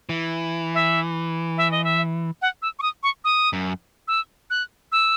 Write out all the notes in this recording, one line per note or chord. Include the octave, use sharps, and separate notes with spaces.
E3
E5
E5
D#5
E5
F#5
E6
C#6
D#6
C#6
D#6
F#2
E6
F#6
E6